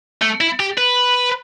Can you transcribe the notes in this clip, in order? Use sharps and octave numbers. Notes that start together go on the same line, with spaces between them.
A3
E4
G4
B4